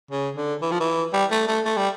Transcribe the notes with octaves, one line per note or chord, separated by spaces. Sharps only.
C#3
D3
E3
F3
E3
G3
A3
A3
A3
G3